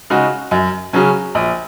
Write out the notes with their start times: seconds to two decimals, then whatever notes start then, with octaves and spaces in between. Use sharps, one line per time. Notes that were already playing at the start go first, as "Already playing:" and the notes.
0.10 C#3 G#3 D#4 F#4
0.51 F#2
0.93 C#3 F#3 C#4
1.35 A#1